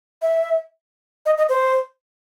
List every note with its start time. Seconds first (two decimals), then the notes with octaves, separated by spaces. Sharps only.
0.22 E5
1.26 D#5
1.38 D#5
1.49 C5